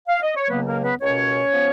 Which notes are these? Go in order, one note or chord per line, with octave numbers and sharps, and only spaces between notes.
F5
D#5
C#5
C#2 C#3 F#3 A#3 B3 B4
A#3 A#4
B3 B4
C#2 B2 A#3 C#4 C#5
F3 B3